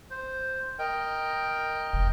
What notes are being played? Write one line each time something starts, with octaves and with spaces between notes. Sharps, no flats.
C5
A#4 D#5 G5
F1